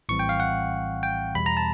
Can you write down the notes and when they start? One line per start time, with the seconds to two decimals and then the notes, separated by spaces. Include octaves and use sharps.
0.09 A#1 A2 E3 G3 C4 C#6
0.19 G5
0.29 F5
0.40 F#5
1.03 G5
1.35 E2 B2 G3 B3 B5
1.46 A#5
1.57 A5